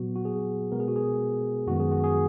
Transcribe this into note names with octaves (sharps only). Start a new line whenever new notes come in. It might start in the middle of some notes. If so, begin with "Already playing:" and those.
Already playing: A#2 F#3 B3 F#4
F#4
G#4
B2 G#3 B3 A#4
G#4
F#4
G#4
F#2 D#3 G#3 B3 F#4
G#4
F#4
G#4